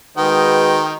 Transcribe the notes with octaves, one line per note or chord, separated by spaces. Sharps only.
D#3 G#3 F#4 B4 D#5 G5